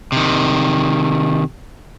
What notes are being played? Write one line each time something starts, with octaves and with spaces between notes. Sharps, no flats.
C3 D#3